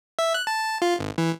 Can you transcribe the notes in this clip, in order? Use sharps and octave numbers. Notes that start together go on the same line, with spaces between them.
E5
F#6
A5
F4
G#1
E3